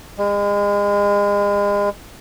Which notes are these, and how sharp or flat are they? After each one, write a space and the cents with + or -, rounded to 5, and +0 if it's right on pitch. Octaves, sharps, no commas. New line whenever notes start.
G#3 -35